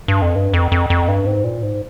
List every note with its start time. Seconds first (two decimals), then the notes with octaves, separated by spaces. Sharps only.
0.08 G2
0.22 F2
0.36 G2
0.54 F2
0.72 F2
0.90 F2
1.08 G2
1.26 G#2
1.44 A#2
1.63 G#2